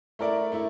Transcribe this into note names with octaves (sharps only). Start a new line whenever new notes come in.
A3 E4 A#4 D5
A3 E4